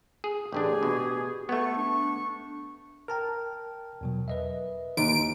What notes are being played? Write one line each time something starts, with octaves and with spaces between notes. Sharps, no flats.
G#4
A1 D3 D4 G4 G#4
B2
A3 B3 C#6
D4 C#6
A#4 G5 A5 F6
E2 B2 F#3
B4 D#5 E5
D#2 D#3 D7